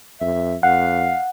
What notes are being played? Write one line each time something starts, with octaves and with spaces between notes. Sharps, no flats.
F2 E5
F2 F5 F#5